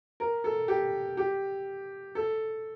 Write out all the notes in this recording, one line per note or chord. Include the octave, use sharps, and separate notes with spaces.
A#4
A4
G4
G4
A4